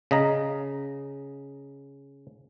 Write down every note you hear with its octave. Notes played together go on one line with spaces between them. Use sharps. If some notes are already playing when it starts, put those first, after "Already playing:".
C#3 D#5 A#5